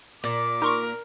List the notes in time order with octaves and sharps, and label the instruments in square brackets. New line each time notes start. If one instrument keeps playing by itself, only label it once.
[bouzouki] A#2 [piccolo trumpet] D6
[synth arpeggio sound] D#4 C6 C#6 [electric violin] A#4